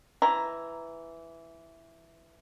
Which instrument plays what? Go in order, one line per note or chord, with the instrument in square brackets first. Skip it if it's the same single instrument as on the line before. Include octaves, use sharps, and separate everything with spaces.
[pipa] E3 A#5